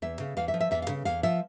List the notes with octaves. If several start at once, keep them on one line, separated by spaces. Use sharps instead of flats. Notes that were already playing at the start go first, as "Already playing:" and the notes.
E2 E5
C#3
E2 F5
E5
F3
E5
E2 E5
F5
C#3
E2 F5
F3 E5